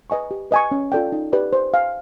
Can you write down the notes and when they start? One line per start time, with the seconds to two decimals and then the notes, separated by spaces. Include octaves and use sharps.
0.10 B4 D#5 G#5 C#6
0.31 G4
0.51 B4 D#5 G#5 C#6
0.71 C#4
0.92 F4 A4 D5 G5
1.12 D#4
1.32 G4 B4 D5
1.53 C5
1.74 F5 G#5